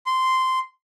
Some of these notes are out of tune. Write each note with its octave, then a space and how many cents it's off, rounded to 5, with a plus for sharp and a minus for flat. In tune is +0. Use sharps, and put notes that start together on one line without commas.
C6 -10